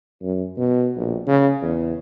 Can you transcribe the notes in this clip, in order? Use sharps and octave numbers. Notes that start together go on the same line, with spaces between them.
F#2
B2
A#1
C#3
E2